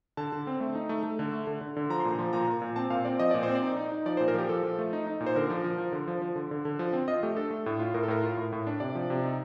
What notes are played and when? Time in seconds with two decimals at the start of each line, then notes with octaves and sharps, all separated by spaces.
0.17 D3 A5
0.32 D3
0.47 C4
0.60 A3
0.75 D#4
0.89 A3
1.03 A3
1.19 D3
1.32 A3
1.47 D3
1.61 D3
1.76 D3
1.90 F3 A#5
2.00 C6
2.05 A#2
2.11 A#5
2.19 F3
2.33 A#2 A#5
2.47 A#2
2.62 A#2
2.76 C4 A5
2.90 A#2 F5
3.05 C4 D5
3.19 F3 D#5
3.31 A#2 D5
3.43 C5
3.48 C4
3.55 D5
3.62 D#4
3.77 D#4
3.92 D#4
4.06 F3 D5
4.17 C5
4.20 A#2
4.28 A#4
4.34 F3 G4
4.49 F3 A4
4.63 F3
4.79 A3
4.93 D#4
5.07 D#4
5.21 A#2
5.26 C5
5.36 D3 A#4
5.50 F3
5.64 F3
5.78 F3
5.92 D3
6.08 F3
6.22 F3
6.36 D3
6.51 D3
6.65 D3
6.79 F3
6.93 C4
7.08 F4 D#5
7.23 A3 G4
7.36 D4 A4
7.51 A3
7.66 A2
7.79 F4
7.94 A2 A#4
8.03 A4
8.08 A2 A#4
8.23 F4
8.37 A2
8.53 A2
8.67 D4
8.80 C3 D5
8.95 F3
9.10 C3
9.23 D#4